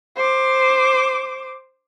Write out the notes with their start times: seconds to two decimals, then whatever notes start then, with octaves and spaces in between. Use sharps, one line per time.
0.16 C5 D6